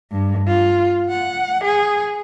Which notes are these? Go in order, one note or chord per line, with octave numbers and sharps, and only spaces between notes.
G2
F4
F#5
G#4